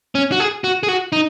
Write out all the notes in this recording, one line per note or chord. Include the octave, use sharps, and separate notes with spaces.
C#4
F#4
G#4
F#4
G#4
F#4
D#4